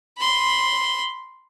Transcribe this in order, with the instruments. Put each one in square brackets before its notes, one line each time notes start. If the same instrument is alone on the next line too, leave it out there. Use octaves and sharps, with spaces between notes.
[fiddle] B5 C6